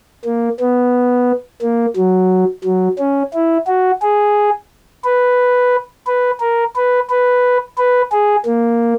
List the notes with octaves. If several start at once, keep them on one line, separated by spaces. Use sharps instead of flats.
A#3
B3
A#3
F#3
F#3
C#4
E4
F#4
G#4
B4
B4
A#4
B4
B4
B4
G#4
A#3